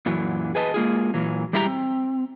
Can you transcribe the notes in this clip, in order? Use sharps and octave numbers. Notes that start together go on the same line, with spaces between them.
F#2 A#2 E3 F#3
G#4 B4 D#5 A5
G#3 A#3 F4 G#4
A#2 E3 F#3
G3 G#3 E4 G4 A#5
C4